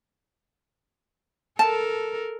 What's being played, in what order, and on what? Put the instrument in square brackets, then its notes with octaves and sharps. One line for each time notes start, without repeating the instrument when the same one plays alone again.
[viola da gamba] A4 A#4 [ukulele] A5